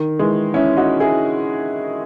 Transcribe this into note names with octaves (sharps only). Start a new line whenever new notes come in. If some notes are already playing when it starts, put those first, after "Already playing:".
Already playing: D#3
E3 G#3
C#4 E4
D#4 F#4
E4 G#4